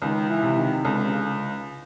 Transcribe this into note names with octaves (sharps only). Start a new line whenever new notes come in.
C#2 D#3
E3
C3
D#3
C#2 D3
C#3